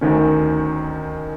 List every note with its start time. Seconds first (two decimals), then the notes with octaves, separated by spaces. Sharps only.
0.01 D2 D#3 C#4